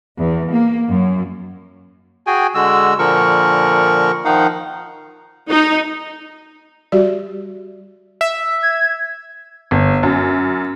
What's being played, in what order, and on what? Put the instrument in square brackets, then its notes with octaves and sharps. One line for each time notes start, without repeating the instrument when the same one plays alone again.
[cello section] E2
A#3
F#2
[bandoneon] F#4 G#4 G5 G#5
D3 G#3 F#4 E6
A#2 D3 F3 A#4 C#6
D#3 F3 D#4 F5 F#5
[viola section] D#4
[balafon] G3 F#4 G4 D5
[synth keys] E5
[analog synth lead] G#6
[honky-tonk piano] G1
F#2